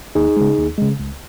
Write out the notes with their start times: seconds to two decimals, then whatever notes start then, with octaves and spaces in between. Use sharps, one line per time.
0.15 D#2 D#4 G#4
0.36 C#3 G#3
0.58 D#2
0.78 C#3 G#3
1.00 C#2